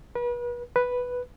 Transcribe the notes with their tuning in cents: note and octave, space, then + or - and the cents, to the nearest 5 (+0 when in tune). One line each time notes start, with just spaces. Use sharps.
B4 -35
B4 +0